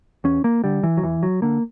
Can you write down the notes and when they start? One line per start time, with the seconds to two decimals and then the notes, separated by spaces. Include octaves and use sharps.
0.24 E2 C#4
0.44 A#3
0.64 D3 G3
0.83 E3
0.97 F#3
1.02 E2 E3
1.23 F#3
1.42 D3 A#3